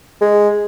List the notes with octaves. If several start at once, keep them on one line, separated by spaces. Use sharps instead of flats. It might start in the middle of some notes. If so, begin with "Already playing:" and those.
G#3